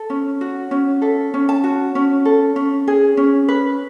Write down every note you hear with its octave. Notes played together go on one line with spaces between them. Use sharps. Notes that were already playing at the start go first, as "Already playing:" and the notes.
Already playing: A4
C#4
F#4
C#4
A4 E5
C#4
A5
F#4
C#4
A4
C#4
G#4
C#4
B4